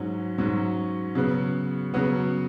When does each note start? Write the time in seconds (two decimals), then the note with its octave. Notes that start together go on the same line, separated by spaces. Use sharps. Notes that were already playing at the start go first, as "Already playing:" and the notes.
Already playing: G#2 F#3 C#4
0.38 G#2 F#3 C#4
1.15 C#3 F#3 B3
1.94 C#3 F#3 B3